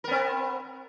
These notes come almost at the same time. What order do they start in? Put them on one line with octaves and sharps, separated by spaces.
A#4 B3 C4